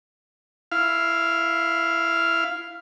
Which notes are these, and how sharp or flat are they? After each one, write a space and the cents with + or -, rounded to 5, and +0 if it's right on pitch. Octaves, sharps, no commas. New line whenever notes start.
E4 +15 F5 +0